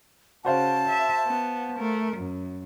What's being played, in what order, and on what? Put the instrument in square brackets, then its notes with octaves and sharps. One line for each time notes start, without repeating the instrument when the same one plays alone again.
[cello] C#3 [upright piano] F#4 C5 F5 [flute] A5
[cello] E5
B3
A3 A#4
F#2